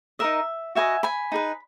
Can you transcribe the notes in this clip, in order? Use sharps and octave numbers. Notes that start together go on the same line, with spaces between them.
D#4 A#4 D#5 E5
F#4 B4 D#5 E5 G#5
G#5 B5
D#4 G#4 B4